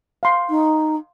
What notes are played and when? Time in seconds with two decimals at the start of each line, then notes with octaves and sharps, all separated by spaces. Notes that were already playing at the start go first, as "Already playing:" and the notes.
0.23 F5 C6
0.50 D#4